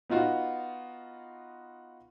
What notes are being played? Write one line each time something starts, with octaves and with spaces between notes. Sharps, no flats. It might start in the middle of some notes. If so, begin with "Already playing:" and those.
B3 D#4 F4 F#4